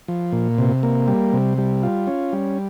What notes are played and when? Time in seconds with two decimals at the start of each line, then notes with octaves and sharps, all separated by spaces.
0.08 F3
0.32 A#2
0.58 C3
0.83 A#3
1.08 G3
1.33 C3
1.58 G3
1.83 F4
2.07 C#4
2.33 G3